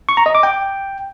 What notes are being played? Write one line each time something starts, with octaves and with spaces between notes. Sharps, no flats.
C#6
A#5
D#5
D6
G5